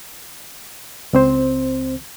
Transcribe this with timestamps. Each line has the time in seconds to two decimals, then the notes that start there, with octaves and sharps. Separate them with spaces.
1.13 C#2 C4 C5